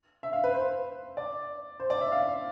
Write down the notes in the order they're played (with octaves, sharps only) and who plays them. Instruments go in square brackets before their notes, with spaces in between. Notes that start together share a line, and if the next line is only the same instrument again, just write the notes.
[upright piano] E5
F5
B4
C5
D5
C5
D5
E5
F5